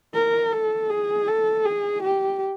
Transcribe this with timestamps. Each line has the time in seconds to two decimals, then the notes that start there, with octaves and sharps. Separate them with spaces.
0.14 A#4
0.52 A4
0.90 G#4
1.28 A4
1.65 G#4
2.03 G4